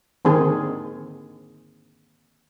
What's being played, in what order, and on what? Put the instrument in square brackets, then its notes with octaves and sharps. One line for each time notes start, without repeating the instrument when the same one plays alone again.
[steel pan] D3 D#3 C4 G#4